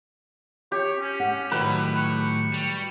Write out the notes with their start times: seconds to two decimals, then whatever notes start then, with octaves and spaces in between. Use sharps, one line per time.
0.72 G4 C#5
0.99 C#4
1.20 F#5
1.51 A2 D#3 F#3 B4
1.96 C#6
2.54 G3